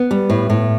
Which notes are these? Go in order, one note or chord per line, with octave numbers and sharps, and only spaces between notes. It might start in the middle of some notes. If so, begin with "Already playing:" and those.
Already playing: B3
G3
A2
A2